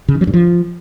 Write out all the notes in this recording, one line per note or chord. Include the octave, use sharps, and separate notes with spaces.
C#3
D#3
F#3
G2
F3